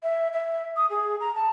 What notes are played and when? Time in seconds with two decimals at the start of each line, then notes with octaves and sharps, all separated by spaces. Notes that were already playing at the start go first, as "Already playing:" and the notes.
0.03 E5
0.33 E5
0.76 D#6
0.90 G#4
1.20 A#5
1.35 A5